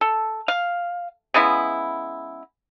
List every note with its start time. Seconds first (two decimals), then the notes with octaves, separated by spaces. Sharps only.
0.01 A4
0.48 F5
1.34 C#3 G#3 B3 E4